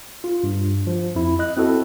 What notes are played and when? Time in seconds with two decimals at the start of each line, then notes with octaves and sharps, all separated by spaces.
0.24 F4
0.44 G2
0.87 F3
1.15 F2 E4
1.39 D#5 F#6
1.57 C4 E4 F#4 A4